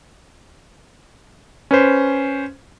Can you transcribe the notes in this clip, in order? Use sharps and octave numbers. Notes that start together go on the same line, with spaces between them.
C#4 B4 C5